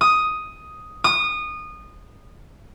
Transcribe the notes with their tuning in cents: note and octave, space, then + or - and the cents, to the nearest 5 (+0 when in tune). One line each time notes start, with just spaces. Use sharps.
D#6 +5
D#6 -20